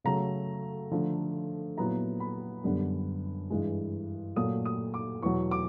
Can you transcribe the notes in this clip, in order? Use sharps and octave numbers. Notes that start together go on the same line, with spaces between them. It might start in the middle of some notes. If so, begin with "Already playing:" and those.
C#3 F#3 A3 A#5
D3 F3 A3
A#2 F#3 B3 E4 A#5
B5
F#2 D3 G3 B3 D4
G2 E3 G#3
A#2 F#3 A3 D#6
D#6
D6
E2 B2 F#3 C#6
D6